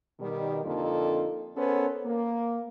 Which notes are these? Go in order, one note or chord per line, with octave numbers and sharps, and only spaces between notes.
B2 D#3 G3
F2 D3 A#3 D#4 F4 A4
B3 C#4 A4 A#4 C5 C#5
A#3